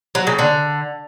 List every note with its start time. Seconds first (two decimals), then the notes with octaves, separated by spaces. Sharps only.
0.15 F#3
0.27 C#3
0.39 D3